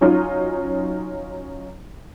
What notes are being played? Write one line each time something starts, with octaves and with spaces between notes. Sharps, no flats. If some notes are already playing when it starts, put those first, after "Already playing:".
F#3 C#4 D#4 F4